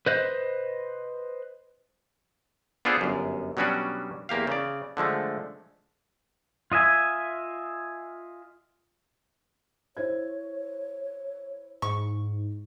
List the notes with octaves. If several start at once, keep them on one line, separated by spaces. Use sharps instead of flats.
B4 C5 D#5
B3 D4 F4 G#4 A4 C5
G1 F#2
B2 F#3 G3 C#4 D4 F#4
E2 A#3 G4 F5
C#3 D5
D3 F3 G#3 A3
F4 D#5 E5 G#5
E4 C5 C#5 G#6
G#2 C#6